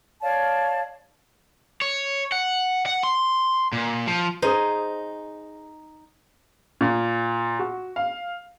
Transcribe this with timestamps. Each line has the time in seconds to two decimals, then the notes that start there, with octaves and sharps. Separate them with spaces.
0.21 C#5 D5 F5 A5
1.82 C#5
2.32 F#5
2.86 F#5
3.04 C6
3.73 A#2
4.07 F3
4.42 D#4 G#4 C5
6.81 A#2
7.59 F#4
7.96 F5